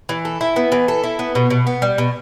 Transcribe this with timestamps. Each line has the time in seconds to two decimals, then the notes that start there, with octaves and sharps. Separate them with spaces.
0.09 E3
0.25 A4
0.41 E4
0.56 B3
0.72 E3
0.88 A4
1.04 E4
1.19 B3
1.35 B2
1.50 B2
1.67 B3
1.82 G3
1.98 B2